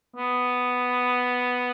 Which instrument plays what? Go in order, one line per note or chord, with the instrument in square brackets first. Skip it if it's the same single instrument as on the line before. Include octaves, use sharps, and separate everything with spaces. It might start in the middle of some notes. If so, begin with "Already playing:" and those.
[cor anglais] B3